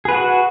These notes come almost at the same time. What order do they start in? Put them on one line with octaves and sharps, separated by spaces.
G#4 B4 F#5 F#4